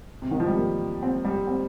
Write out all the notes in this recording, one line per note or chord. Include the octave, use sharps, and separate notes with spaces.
C3
D#3
F3
G3
A#3
C4
G3
C4